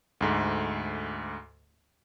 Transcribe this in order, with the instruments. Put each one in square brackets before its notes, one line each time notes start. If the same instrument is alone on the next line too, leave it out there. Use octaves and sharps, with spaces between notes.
[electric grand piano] D2 G#2 A3